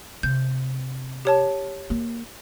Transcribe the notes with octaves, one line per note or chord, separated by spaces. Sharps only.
C3 G6
G4 C#5 A5
A#3